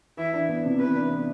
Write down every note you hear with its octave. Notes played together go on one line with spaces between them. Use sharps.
E3 E4
D4
B3
C3
E3 B4
D4
B3